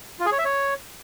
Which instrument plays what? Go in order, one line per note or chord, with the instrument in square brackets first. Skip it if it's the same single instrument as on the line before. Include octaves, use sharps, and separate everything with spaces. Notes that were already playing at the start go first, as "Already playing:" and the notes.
[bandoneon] F4
G#4
C#5
E5
C#5